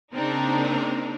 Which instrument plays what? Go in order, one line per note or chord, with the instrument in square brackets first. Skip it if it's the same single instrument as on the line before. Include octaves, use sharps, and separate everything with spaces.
[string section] C#3 A#3 C4 D4 D#4 A#4